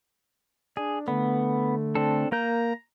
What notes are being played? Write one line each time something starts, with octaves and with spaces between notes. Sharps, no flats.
D4 G#4
D3 A3 B3
C4 D4 A4
A#3 A#4 A#5 G6